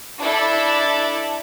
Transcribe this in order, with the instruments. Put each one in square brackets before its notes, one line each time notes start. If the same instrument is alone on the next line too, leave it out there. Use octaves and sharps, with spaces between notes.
[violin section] D4 E4 A4